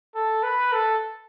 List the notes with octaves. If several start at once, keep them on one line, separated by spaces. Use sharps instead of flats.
A4
B4
A4